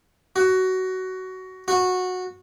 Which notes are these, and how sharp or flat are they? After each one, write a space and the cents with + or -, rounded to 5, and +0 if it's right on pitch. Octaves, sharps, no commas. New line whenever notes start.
F#4 +15
F#4 -15